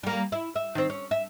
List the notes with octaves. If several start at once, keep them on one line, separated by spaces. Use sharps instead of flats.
G3 A#3
E4
E5
D#3 C4
C#4
E5